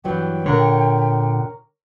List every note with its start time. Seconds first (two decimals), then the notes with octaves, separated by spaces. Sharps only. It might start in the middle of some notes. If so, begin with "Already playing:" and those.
0.04 G2 E3 F#3 G5
0.46 A#2 D3 A#4 C#5